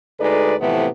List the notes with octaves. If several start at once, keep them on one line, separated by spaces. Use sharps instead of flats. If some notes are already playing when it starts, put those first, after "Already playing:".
D2 G#3 D#4 A4 B4 D5
A2 C3 E3 F3 A3 B3